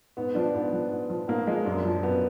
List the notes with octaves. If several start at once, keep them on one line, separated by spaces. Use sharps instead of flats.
G#2 B3
F3 D4
G#2 B3
F3
G#2
F3
G#2 A#3
F3 G#3
F#2 D4
F3
F#2 B3